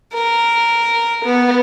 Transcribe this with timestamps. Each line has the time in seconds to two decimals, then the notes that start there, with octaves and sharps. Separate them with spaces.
0.13 A#4
1.24 B3